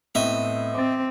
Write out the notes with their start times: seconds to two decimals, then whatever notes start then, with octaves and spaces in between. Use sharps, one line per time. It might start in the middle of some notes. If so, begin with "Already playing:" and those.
0.15 A2 B3 C4 D#5 E5
0.75 C4 D6 A6